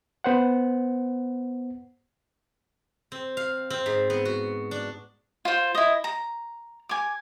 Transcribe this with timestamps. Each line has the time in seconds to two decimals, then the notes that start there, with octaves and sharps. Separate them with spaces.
0.24 B3 C5 F#5
3.12 C4
3.37 F5
3.70 C4
3.86 G#2
4.10 B3
4.25 F#4
4.71 D4
5.45 F4 C5
5.75 E4 D#5
6.04 A#5
6.89 G#5 D6